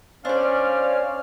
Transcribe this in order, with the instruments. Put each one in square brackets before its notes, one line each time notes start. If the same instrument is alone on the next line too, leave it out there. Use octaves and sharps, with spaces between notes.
[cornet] C#4 [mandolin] D4 D5 [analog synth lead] C5 [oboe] F5